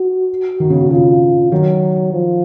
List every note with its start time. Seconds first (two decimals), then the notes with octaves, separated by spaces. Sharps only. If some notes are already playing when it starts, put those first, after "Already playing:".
Already playing: F#4
0.60 D#3
0.70 C#3
0.81 B2
0.91 C#3 F4
1.51 D#3 F#3
2.13 F3